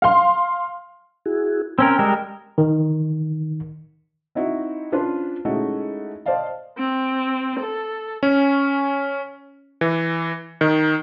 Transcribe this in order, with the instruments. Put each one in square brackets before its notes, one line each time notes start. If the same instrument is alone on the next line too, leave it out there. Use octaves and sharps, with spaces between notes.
[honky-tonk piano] F5 C6
[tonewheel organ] E4 F#4 G#4
[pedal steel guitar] C4 C#4 A#4 [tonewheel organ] G5 E6
[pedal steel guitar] G3 G#3 A#4
[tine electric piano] D#3
[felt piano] C4 D#4 E4 F#4
C#4 D4 F4 B4 C5
G#3 A3 C#4 D#4 E4 F#4
C5 D5 D#5 F5 A5
[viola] C4
A4
[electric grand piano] C#4
E3
D#3